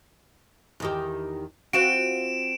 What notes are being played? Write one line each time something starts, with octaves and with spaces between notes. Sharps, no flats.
E2 D#3 G4
C4 F4 F#4 D7 E7